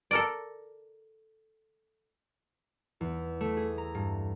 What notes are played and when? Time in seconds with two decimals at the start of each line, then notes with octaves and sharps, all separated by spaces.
0.11 A4 A#4 D5
3.01 E2
3.41 A3
3.57 G#4
3.78 A#5
3.95 G2